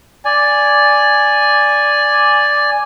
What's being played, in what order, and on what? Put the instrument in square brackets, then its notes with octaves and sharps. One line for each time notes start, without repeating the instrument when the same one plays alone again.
[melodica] D5 G#5